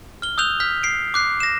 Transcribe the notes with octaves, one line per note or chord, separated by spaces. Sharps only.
F6 G7
D#6 E6 F#6 G6 F7 G7
F6 G6 B6
C7 D7
D6 F#6 C7
A#6 E7